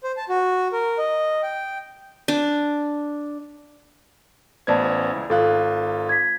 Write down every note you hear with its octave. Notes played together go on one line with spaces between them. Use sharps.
C5
A5
F#4
A#4
D#5
G5
D4
A1 B3 C5 D5 A5 G#6
C#2 E4
G#1 F4 A4 F5 F#6
G#6 B6